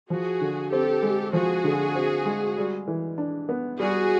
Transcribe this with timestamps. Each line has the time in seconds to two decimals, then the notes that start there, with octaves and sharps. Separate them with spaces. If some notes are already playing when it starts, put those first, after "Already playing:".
0.10 F3 F#4 G#4
0.41 D3
0.71 C4 G4 A4
1.02 G#3
1.33 F3 F#4 G#4
1.64 D3
1.95 C4
2.25 G#3
2.57 G3
2.88 E3
3.18 D4
3.49 B3
3.80 G3 F#4 G#4